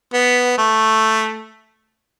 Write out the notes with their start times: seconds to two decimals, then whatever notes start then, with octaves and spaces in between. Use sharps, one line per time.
0.13 B3
0.58 A3